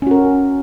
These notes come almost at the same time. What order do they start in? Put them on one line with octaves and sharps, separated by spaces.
C#4 F#4 A#4